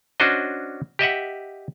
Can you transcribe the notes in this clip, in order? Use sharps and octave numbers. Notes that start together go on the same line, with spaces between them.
C#4 D4 F#4 C5 D#5
G4 D#5 E5 F#5